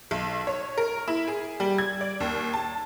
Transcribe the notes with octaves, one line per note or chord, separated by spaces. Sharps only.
B1
C#5
A#4
E4
G#4
G3
G#6
D5
D#2
A5